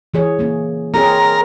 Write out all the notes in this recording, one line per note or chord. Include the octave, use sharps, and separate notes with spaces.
E3 G#4 C#5
A#3 C#4
C4 G#4 A#4 C#5